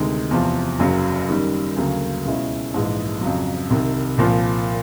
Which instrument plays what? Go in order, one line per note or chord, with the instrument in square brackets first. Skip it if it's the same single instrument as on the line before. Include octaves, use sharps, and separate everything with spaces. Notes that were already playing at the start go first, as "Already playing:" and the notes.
Already playing: [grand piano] D2 C3 D#3 G#3
E2 C3 F3
F#1 F#2 C#3 F#3
F#2 D#3 G3
D2 C#3 F#3 A#3
C#2 B2 G#3 C#4 E4
A#1 G#2 E3 G#3
F2 C#3 F#3
C2 C3 D#3
C2 A#2 F3